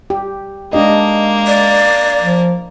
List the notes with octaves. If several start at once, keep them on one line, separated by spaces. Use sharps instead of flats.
G4
G#3 A#3 D4 G4 D#5
D5
F3